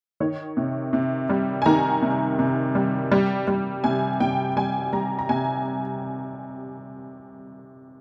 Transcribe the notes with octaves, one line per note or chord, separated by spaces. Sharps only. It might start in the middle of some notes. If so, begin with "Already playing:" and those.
D#3 C#5
C3
C3
G3
G#5
D#3 A#5
C3
C3
G3
G3
G3
C3 G#5
C3 G5
G3 G#5
G3 A#5
A#5
C3 G#5